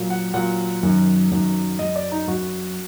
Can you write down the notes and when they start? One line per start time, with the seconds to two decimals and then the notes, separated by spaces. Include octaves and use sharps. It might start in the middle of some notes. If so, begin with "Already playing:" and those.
Already playing: A#2 F#3
0.10 F#5
0.34 A#2 F#3 F#5
0.83 F#2 D#3 F#3
1.31 F#2 D#3 F#3
1.79 F#2 F#3 D#5
1.96 D5
2.12 D#4
2.27 F#2 F#3 F#4